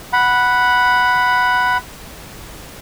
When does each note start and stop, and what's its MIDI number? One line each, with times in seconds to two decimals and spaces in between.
0.13 1.77 78
0.13 1.77 83